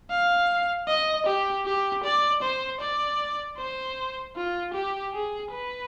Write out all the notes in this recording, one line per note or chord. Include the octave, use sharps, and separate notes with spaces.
F5
D#5
G4
G4
D5
C5
D5
C5
F4
G4
G#4
B4